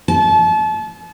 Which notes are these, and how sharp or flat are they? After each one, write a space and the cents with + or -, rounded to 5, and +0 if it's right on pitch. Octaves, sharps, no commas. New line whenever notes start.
A5 -35